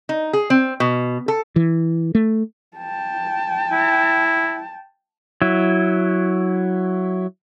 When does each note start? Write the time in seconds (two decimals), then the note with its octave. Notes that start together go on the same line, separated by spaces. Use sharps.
0.09 D#4
0.33 G#4
0.50 C4
0.80 B2
1.28 A4
1.56 E3
2.15 A3
2.77 G5 A5
3.72 E4
5.42 F#3 E4